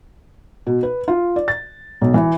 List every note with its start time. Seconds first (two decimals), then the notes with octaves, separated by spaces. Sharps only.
0.67 B2
0.83 B4
1.08 F4
1.36 D5
1.48 A6
2.01 B1
2.14 E3